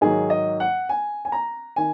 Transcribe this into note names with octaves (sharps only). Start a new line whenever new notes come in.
G#2 D#3 F#3 G#4
D#5
F#5
G#5
G#5
A#5
D#3 G#5